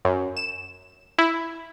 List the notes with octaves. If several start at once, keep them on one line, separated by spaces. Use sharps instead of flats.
F#2
E7
E4